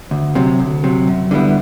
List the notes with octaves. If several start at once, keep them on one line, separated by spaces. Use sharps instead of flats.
D2
C3 F#3
D2
C3 F#3
F#2
D3 G3 B3 E4